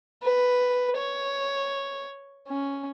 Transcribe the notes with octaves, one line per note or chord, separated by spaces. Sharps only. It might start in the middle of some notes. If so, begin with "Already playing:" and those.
B4
C#5
C#4